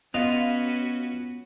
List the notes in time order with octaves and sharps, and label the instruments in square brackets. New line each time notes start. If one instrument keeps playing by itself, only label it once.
[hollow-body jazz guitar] B3 [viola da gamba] C#4 F#4 B4 [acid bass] F4 [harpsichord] D#5 F5